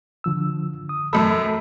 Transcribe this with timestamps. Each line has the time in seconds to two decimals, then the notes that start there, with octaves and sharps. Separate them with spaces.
0.24 D3 F3 E6
0.89 D#6
1.13 F#2 A3 A4 B5 E6